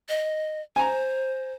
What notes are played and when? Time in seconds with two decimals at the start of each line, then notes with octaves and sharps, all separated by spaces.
0.09 D#5
0.76 C5 G#5 A#5